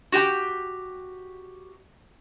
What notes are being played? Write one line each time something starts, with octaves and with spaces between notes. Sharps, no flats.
F#4 G4 G5